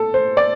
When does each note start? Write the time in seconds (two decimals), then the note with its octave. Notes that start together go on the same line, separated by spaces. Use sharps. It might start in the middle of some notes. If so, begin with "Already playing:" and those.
Already playing: A4
0.14 C5
0.37 D5